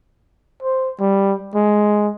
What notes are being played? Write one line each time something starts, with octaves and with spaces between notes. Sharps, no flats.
C5
G3
G#3